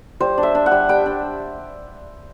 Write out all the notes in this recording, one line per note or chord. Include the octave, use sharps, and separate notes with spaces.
G3 C5
D4
E5
D4
F#5
G3
G3 G5
D4